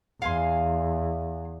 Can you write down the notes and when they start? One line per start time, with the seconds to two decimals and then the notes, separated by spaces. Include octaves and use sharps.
0.22 E2 F5 G#5 C6